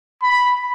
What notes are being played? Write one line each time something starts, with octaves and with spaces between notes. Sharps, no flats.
B5